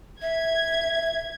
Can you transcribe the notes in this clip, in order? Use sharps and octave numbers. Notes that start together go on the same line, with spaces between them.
E5 G#6